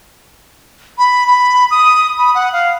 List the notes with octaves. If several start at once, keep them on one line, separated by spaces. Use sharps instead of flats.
B5
B5
D#6
B5
F#5
F5